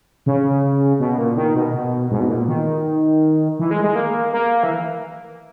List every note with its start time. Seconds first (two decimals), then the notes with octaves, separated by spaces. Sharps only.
0.26 C#3
1.00 B2
1.18 A#2
1.37 D#3
1.55 B2
1.73 B2
2.11 G#2
2.20 B2
2.29 A#2
2.48 D#3
3.59 E3
3.71 G#3
3.84 G#3
3.95 A#3
4.33 A#3
4.63 E3